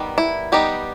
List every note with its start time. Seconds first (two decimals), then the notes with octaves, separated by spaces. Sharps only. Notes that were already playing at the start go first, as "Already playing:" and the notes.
Already playing: D#3 G3 B3
0.18 E4
0.52 G3 B3 D#4 G4